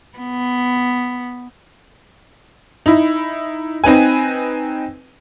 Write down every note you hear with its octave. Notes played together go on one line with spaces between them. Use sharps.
B3
D#4 E4
C4 D#4 B4 G#5